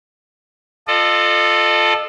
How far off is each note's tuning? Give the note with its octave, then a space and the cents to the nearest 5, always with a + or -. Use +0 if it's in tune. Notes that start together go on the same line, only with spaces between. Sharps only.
F4 +0 A4 +0 D#5 -40